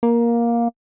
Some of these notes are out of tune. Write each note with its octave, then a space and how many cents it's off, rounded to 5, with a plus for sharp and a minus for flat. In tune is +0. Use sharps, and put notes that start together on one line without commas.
A#3 +10